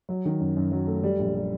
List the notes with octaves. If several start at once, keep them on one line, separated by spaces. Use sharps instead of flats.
F#3
D#3
F#2
F#2
F#3
A3
G3
A#1
G3